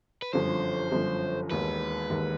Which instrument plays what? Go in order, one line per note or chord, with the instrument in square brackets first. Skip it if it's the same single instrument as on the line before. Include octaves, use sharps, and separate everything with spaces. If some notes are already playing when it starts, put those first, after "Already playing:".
[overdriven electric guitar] B4
[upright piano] G1 F#2 D3 F3 [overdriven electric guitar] C5
[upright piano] G1 F#2 D3 F3
[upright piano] E1 D#2 D#3 [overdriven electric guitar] B4
[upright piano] E1 D#2 D#3